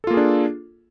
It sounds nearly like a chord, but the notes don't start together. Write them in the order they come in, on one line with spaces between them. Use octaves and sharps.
A4 F4 A#3 G#4 D4